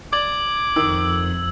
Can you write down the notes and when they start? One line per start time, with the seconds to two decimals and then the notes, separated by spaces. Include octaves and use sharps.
0.13 D5 D6 G#6 F#7
0.76 F2 D#3 E6